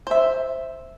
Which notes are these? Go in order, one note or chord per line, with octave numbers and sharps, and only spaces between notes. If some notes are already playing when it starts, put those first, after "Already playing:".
C5 E5